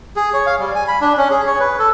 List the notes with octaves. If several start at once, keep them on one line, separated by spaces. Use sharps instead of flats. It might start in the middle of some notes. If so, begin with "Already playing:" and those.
G#4
C#5
F5
G3
G#5
B5
D4
C#4
G#4
C#5
B4
A4